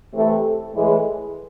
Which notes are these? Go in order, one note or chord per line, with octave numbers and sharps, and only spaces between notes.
C3 E3 A3
A2 E3 G#3